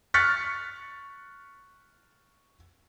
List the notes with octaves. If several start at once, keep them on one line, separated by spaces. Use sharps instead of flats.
C#6 F6 F#6 A6 B6 C#7